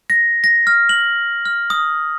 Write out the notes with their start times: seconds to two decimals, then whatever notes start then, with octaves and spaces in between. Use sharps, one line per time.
0.10 A#6
0.44 A#6
0.67 F6
0.89 F#7
1.46 F6
1.70 D#6